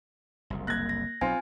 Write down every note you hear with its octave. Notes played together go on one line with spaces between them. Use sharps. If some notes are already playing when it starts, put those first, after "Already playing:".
F#1 C2
A#3 F#6 G#6 A#6
A#6
B1 C4 F4 G#5